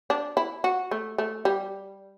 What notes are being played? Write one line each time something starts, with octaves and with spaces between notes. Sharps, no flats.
D4
E4
F#4
A3
A3
G3